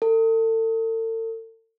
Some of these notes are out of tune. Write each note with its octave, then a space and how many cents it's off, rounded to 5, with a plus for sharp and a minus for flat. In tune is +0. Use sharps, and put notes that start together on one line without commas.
A4 +40